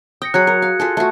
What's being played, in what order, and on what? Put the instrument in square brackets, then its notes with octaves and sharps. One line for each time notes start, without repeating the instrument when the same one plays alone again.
[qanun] G5 [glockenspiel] D#6 A#6 C#7
[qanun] F#3 G#4 B5 [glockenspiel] F#6 G#6 C#7
[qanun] A#4
F5
F4 G#4 A4
[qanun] A3 F#4 [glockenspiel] A5